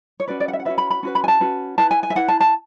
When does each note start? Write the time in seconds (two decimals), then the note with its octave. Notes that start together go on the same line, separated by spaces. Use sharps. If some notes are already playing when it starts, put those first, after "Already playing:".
0.20 C#5
0.28 C#4 F#4 B4 D5
0.40 D5
0.48 F#5
0.53 E5
0.60 F#5
0.65 C#4 F#4 B4 E5
0.78 B5
0.90 B5
1.03 C#4 F#4 B4
1.15 B5
1.24 G#5
1.28 A5
1.40 C#4 F#4 B4
1.78 E4 B4 A5
1.91 G#5
2.03 G#5
2.10 E5
2.15 E4 B4 F#5
2.28 A5
2.40 A5